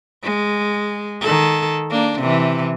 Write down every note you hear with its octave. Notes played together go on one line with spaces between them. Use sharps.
G#3
D#3 A4
A#3 D4
C3 E3